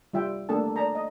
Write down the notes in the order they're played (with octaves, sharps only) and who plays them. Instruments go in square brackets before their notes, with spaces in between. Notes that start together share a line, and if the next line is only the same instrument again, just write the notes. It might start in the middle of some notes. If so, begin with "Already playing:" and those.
[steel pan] G3 F4 E5 G5
A3 A#3 D4 A4 A5
D5 A5 A#5
D#5